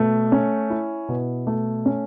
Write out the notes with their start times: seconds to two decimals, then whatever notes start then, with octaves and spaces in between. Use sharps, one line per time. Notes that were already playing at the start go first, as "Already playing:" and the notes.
Already playing: B2 A3
0.32 C#4
0.70 E4
1.09 B2
1.47 A3
1.86 C#4